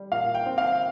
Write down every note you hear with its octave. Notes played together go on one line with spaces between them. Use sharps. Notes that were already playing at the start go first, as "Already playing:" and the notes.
Already playing: G3
A#2 F5
G5
C4
F5